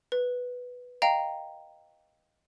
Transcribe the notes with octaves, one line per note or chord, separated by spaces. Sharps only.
B4
D#5 F5 G5 A#5